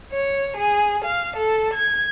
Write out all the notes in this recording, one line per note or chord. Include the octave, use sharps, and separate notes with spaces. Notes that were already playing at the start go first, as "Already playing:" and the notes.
C#5
G#4
F5
A4
G#6